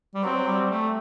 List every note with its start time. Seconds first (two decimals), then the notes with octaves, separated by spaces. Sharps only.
0.15 G3
0.23 F#3 C4
0.47 G3
0.71 A3